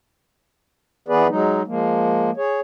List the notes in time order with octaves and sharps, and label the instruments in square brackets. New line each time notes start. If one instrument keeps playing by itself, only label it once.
[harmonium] E3 B3 G#4 B4 D5
F#3 G#3 D#4
F3 G#3 A#3
G#4 C#5